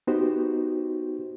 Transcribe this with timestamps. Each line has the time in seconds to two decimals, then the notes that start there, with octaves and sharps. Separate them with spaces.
0.07 B3 D#4 F#4 G4 C5